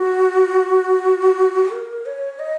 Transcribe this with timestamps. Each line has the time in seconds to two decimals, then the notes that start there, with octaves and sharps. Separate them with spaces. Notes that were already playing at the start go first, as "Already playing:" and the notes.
Already playing: F#4
1.71 A#4
2.06 C#5
2.39 D#5